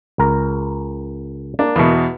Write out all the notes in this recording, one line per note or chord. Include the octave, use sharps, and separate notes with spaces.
C#2 A#4 A#5
A#3 D4
E2 B2